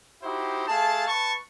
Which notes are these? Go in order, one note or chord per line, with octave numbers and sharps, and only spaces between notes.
D#4 E4 F#4 G4 C5
A3 G#4 F5 A5
B4 A5 C#6